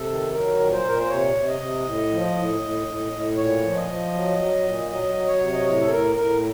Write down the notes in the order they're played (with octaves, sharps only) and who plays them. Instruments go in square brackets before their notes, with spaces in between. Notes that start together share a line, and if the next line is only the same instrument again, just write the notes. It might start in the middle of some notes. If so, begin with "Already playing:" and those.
Already playing: [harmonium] C3 A4
D#3
F#3 A#4
A#2
C5
A#2 A#4
C5
C3 C#5
C3
D#5
C3
A2
F3
A2
A2
A2
A2
A#2 C#5
F3
D#5
F3
F#3
F#3
A#2
F#3 D#5
F#3
C#5
C3
D#5
A2 C#5
A4
A2 A#4
A2 A#4